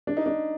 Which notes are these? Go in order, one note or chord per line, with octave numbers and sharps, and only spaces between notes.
D4
D#4
D4